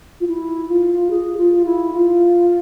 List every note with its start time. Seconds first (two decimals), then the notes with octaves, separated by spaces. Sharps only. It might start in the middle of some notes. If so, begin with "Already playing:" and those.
0.20 F4
0.27 E4
0.68 F4
1.10 G#4
1.37 F4
1.65 E4
1.93 F4